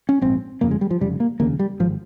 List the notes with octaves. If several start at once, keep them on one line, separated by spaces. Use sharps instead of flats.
C#4
A#1 G#2 C4
G1 F2 C#3 A#3
G#3
G3
F3
F1 F2 C#3 G3
A#3
F1 D#2 C#3 A#3
G3
G#1 F3